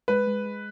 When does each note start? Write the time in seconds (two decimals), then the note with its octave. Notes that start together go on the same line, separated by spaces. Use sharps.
0.08 G#3 B4
0.27 G#3
0.46 G#3